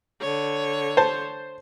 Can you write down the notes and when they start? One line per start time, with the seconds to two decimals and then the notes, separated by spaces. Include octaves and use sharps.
0.21 D3 C#5
0.97 C5 A5